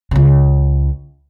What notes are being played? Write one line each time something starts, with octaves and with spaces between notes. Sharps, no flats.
C#2 C#3